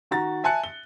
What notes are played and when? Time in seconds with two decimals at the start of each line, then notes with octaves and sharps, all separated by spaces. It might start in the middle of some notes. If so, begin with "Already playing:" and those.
0.11 D#3 F#4 A#5 A6
0.44 E5 G#5 A5 F#6 C#7
0.64 G7